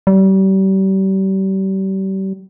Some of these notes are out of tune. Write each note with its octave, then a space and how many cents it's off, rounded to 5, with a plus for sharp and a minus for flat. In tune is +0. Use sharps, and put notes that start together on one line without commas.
G3 -35